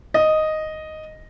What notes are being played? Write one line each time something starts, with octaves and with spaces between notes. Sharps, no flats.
D#5